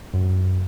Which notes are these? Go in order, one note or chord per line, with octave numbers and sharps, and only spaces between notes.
F#2